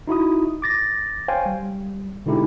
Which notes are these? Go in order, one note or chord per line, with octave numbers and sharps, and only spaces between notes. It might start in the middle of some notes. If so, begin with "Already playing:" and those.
D#4 E4 F#4 D#6
D6 A6 A#6
C5 C#5 F5 G5 G#5
G3
B2 D3 G#3 D#4 E4 G4